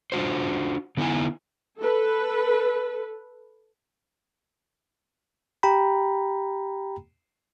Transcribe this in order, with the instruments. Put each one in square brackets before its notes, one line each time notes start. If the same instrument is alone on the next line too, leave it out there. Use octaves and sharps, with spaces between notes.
[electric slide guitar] D4 F4 F#4 C5
D3 B3 D#4 E4 G#5
[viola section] A4 B4
[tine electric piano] G4 G5 A#5 B5